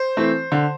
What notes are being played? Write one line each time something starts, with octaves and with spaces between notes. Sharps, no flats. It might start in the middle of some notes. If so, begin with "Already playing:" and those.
Already playing: C5
E3 A3 C4
D3